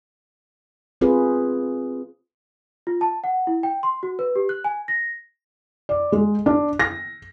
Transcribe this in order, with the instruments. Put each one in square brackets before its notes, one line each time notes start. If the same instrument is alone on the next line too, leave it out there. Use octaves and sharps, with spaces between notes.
[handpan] C4 F4 G#4 B4 C5
[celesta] F4
A5
F#5
E4
G5
C6
F#4
B4
G4
F#6
G#5
A#6
[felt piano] D5
G#3
D4
A#6